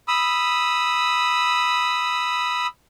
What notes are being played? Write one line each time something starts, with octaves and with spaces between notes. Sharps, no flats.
B5 D#6 E6